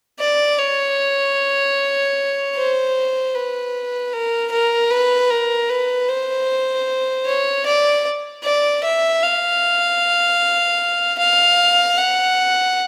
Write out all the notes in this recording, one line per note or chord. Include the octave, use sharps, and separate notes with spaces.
D5
C#5
C5
B4
A#4
A#4
B4
A#4
B4
C5
C#5
D5
D5
E5
F5
F5
F#5